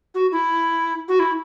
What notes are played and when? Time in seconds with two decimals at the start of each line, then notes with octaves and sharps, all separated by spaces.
0.14 F#4
0.32 E4
1.08 F#4
1.19 E4